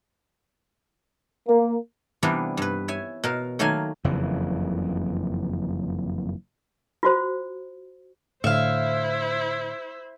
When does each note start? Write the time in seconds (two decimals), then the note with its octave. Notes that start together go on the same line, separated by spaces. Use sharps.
1.48 A#3
2.23 C3 E3 G3 B3 D4 A#4
2.57 G2 B4
2.88 C#5 E5 G#5
3.24 B2 A#4 F5
3.59 D#3 F#3 A3 A#3 F5 G#5
4.04 F#1 F2 C#3 E3
7.03 F4 F#4 C5
8.44 A2 D3 E4 C5 E5 F5